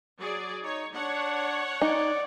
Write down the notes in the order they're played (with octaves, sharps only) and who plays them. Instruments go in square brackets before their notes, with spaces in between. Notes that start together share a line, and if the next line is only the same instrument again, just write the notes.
[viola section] F#3 G#4 D5
[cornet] D#4 [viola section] C#5
[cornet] D4 [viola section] C#5 F#5
[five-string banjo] D#4 [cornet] D5